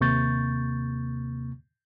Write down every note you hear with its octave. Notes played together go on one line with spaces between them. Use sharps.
D#2 C3 A#3 C#6 G6 A6